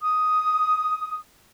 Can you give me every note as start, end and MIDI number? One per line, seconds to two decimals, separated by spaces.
0.01 1.17 87